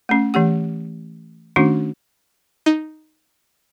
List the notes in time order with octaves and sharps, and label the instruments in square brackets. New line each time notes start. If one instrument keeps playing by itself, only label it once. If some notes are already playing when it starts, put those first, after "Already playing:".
[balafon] A3 C#4
E3 A3 G4 F#5
D#3 A3 C#4 D4 F#4
[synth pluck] D#4